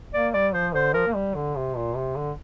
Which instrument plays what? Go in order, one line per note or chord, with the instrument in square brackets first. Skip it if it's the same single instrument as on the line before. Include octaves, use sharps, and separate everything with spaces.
[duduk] A#3 [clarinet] D5
[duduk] G3 [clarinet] D5
[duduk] F3 [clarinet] C5
[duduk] D3 [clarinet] C5
[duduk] F3 [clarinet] A#4
[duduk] A#3
G3
D3
C3
A#2
C3
D3